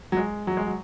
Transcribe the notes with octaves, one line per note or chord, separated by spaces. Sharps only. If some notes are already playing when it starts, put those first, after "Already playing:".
F#3
G#3
F#3
G#3
F#3